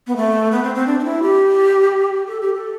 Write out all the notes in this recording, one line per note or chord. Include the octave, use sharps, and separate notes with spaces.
B3
A3
B3
C4
C4
D4
D4
E4
G4
A4
G4
A4